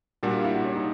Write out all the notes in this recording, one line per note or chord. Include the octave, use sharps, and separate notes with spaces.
A#2 G3 A#3 D4 F#4
F4
E4
F#4
C#4
D#4